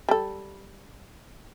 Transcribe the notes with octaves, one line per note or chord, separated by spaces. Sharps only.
G3 A4